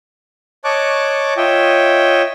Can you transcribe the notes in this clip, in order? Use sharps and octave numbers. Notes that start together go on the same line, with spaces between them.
C#5 D#5 A5 C#6 D6 F#6
F4 C#5 D#5 E5 G5